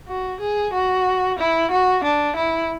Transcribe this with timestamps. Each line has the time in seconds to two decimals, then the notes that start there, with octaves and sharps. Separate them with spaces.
0.08 F#4
0.40 G#4
0.74 F#4
1.39 E4
1.71 F#4
2.04 D4
2.36 E4